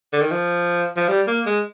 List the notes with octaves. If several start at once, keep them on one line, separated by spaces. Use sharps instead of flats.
D3
D#3
F3
F3
G3
A#3
G#3